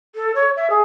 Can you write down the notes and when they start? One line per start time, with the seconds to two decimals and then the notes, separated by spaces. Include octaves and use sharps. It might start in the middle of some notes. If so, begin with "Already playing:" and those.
0.15 A4
0.35 C#5
0.56 E5
0.70 G#4